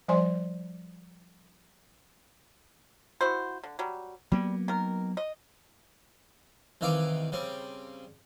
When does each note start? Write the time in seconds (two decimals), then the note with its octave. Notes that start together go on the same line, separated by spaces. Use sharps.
0.08 F3 G3 C5 D5 G#5 C6
3.21 E4 F#4 C5
3.63 D3
3.79 F#3 G3
4.32 F#3 G3 A#3 B3
4.68 D#3 A#4
5.17 D#5
6.81 C2 D#3 E3 E5 F5 D6
7.32 C#3 G3 C4